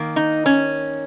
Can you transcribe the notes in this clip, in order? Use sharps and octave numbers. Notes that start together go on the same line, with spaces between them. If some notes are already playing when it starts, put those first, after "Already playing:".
Already playing: D#3 A#3
D#4
C#4